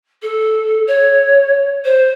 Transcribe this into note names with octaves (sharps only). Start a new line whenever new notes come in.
A4
C#5
C5